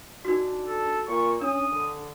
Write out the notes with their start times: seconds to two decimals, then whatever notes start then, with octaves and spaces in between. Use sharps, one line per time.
0.25 D4 D#4 F#4
0.67 A4
1.08 A#2 C#6
1.41 C#4 D4 D#6
1.72 D3